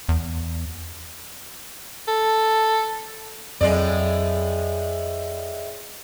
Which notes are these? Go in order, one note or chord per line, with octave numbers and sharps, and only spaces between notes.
E2
A4
F2 A2 F#3 G#3 D5